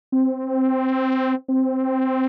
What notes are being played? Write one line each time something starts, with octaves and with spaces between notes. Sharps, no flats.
C4
C4